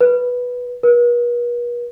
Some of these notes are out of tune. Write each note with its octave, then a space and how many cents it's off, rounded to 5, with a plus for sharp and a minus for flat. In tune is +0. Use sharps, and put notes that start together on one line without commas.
B4 -5
B4 -45